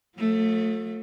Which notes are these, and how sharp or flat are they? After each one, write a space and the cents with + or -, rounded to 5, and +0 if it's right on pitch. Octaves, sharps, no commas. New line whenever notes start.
F#3 -40 A3 +15